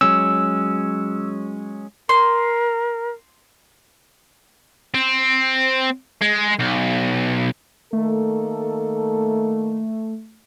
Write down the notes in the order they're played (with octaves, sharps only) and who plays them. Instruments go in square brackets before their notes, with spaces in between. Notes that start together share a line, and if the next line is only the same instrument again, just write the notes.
[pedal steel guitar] F#3 G#3 C#4 [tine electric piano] E6
[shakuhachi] A#4 [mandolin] C6
[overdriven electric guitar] C4
G#3
B1
[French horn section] D#3 A#3 A4 [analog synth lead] A3